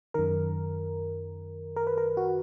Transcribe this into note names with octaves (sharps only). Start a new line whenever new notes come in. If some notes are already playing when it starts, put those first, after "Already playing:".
F#2 D#3 A#4
A#4
B4
A#4
F#4